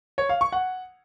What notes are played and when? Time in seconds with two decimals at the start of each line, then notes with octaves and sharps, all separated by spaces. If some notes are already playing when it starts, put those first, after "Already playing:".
0.18 C#5
0.29 F5
0.41 C#6
0.52 F#5